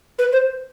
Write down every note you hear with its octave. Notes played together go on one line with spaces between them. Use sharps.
B4
C5